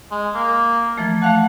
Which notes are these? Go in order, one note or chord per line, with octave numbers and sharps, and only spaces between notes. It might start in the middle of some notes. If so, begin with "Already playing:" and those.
G#3
A#3
E3 F3 A3
A3 F5 F#5 A5